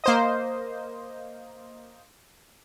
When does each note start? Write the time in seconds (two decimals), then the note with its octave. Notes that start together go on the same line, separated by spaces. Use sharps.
0.04 A#3 C5 D#5